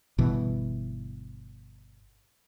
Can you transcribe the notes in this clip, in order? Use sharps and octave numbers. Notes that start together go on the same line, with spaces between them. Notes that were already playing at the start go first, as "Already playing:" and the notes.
G1 B2 E3